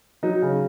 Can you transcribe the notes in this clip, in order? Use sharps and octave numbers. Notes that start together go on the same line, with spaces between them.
F#3 D#4
C#3